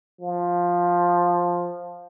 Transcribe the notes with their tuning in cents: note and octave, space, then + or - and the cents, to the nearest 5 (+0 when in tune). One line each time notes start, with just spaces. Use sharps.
F3 +10